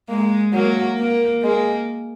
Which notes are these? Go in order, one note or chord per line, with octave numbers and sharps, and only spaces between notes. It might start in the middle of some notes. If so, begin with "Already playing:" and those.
G#3 A#3
F#3 A#3
A#3
G#3 A#3